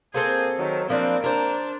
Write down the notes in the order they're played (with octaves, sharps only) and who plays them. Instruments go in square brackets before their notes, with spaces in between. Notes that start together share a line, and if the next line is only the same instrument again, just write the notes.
[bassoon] A#3 [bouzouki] C4 A4 C5 [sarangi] G#4
[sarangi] D#3 [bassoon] F#3
[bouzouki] F3 D4 B4 [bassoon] A#3 [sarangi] C4
[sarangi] D4 [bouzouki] A#4 C5